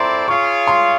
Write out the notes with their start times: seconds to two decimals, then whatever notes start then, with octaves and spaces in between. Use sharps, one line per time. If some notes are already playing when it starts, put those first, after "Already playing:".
Already playing: C4 E4 A4 D5 A#5 C6
0.28 F4 G#4 C#5 F5 C#6
0.67 C6